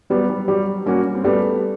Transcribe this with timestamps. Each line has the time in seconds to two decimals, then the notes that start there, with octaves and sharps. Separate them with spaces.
0.10 F#3 G3 B3
0.29 G3
0.48 F#3 G3
0.86 G3 A#3 C#4 F#4
1.15 C4
1.24 G3 A3 B3